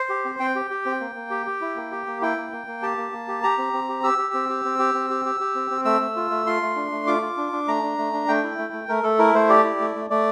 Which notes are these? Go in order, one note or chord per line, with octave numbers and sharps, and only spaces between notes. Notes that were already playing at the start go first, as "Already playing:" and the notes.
Already playing: C5
G4
C4
C4 G5
G4
G4
C4
A#3
A#3
G4
G4
E4
A#3
G4
A#3
E4 G5
A#3
A#3
A#3
G4 A5
A#3
A#3
G4
G4 A#5
C4
C4
G4
G4 E6
G4
C4
G4
C4
G4
C4
G4
G4
G4
C4
C4
A3 E6
A3
F4
A3
F4 C6
A3
D4
A3
F4 D6
F4
D4
D4
A3 A#5
D4
A3
D4
A3 G5
E4
A3
A3
A3 A#4
A3 A4
E4 A#4
A3 C5
G4 D5
E4
A3
A3
A3 D5